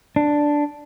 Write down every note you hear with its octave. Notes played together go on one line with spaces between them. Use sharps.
D4